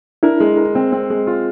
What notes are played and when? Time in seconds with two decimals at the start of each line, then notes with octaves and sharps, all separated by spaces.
0.23 D4 E4 A#4
0.40 G#3
0.57 A#4
0.75 C4
0.92 C4
1.10 G#3
1.27 F4